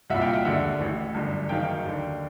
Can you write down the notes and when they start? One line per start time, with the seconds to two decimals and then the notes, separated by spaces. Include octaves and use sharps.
0.10 C2 A#2 E5 F#5
0.21 F5 G5
0.33 E5 F#5
0.45 E1 D#2 D3 E5 F#5
0.80 A1 A2 E3
1.14 G1 F#2 D3
1.49 F#1 F#2 D#3 F5 G5
1.85 D#2 D3